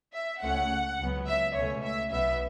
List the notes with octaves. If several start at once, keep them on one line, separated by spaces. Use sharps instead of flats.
E5
C#2 C#3 A3 C#4 F#5
C#2 C#3 F#3 B3
E5
C#2 B2 A3 C#4 C#5
E5
B1 B2 B3 E5